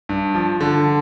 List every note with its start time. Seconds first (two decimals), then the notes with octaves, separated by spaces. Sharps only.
0.09 G2
0.35 F3
0.60 D3